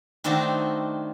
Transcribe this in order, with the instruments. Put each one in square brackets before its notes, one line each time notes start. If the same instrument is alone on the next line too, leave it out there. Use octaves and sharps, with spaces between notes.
[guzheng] D#3 A3 C4 D4 D#4 F#4